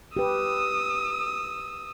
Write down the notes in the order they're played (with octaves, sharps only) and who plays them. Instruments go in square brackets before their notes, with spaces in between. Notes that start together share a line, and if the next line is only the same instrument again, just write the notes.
[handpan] G4 B4 [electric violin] D#6 E6